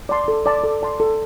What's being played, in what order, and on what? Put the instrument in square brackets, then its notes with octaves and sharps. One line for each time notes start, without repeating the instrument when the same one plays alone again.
[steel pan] D5 A5 C6
A4
D5 A5 C6
A4
D5 A5 C6
A4